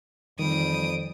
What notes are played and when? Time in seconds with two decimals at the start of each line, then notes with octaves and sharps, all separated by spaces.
0.39 F2 D#3 E3 G3 D#6 D7